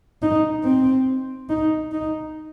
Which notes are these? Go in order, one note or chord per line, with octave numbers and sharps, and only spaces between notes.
D#4
C4
D#4
D#4